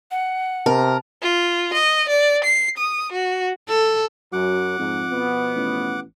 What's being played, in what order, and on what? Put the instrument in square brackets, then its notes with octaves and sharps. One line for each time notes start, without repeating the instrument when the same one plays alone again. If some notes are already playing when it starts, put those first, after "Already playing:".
[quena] F#5
[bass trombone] C3 [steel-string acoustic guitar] A#4 [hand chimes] A5
[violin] F4
D#5
D5
C7
D#6
F#4
[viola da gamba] A4
[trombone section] F#2 [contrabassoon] F#3 [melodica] F#5 D6
[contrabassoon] F2 [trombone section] G#2
[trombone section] B2 F3 B3
[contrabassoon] A1